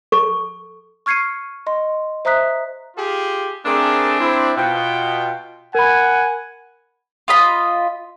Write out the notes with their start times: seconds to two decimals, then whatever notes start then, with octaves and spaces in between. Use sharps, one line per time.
0.12 A4 C#6
1.06 C#6 F6 G#6 C7 C#7 D#7
1.67 D#5 C6
2.25 C5 E5 A#5 D#6 F#6 B6
2.97 F4 G4 G#4
3.66 A3 C4 D4 G#4 A#4 D5
4.20 E4 C5
4.57 B2 F4 G5
5.75 A#4 F#5 G#5 B5
7.28 F4 D#5 B5